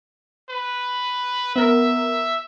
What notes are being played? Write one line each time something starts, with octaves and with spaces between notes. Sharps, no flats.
B4
B3 A#4 E5